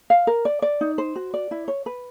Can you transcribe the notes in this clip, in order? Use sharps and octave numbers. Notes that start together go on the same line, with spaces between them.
F5
A#4
D5
D5
D#4
C5
F#4
D5
E4
C#5
B4